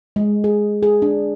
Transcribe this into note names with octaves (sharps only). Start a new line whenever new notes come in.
G#3
G#4
G#4
D4